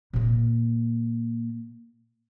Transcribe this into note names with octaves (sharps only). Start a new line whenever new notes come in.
A#2 A#3